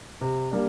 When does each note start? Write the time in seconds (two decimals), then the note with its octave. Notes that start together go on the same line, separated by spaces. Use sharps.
0.21 C3
0.51 G3 A#3 D4